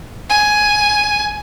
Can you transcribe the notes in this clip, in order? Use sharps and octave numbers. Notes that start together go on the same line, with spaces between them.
G#5